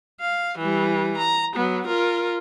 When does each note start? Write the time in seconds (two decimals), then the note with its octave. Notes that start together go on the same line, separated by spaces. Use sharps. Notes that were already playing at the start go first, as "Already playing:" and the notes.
0.20 F5
0.58 E3 G3
1.17 A#5
1.56 F#3 B3
1.87 F4 A#4